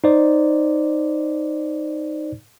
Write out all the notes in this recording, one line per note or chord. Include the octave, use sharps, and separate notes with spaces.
D#4 C5 D5